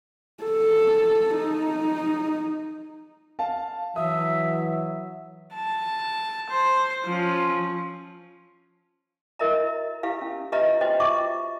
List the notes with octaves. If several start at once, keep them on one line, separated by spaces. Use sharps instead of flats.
A4
D#4
F5 A5
E3 F#3 E5 D#6
A5
C5
F3 C#4
E4 F#4 A#4 D#5 E5 A#5
E4 G4 F5
C#4
F4 G4 B4 D#5 E5 A#5
F#4 C5 D#5 G5
F4 E5 A#5 C#6 D6